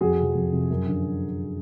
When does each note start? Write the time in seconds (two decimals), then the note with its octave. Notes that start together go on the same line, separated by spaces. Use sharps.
0.01 F2 F#4 G#4
0.19 C3 F3
0.35 F2
0.52 C3 F3
0.70 F#2
0.87 D3 F3